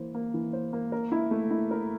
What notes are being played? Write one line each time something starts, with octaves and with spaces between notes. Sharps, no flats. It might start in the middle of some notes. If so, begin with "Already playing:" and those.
Already playing: E3 A#3 C5
A#3
E3
C5
A#3
A#4
E4
A3
E4
A#4